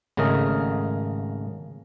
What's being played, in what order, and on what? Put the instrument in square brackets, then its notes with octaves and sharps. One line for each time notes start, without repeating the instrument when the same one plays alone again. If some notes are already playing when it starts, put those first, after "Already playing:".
[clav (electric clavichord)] G#1 C#3 A3 A#4 D#5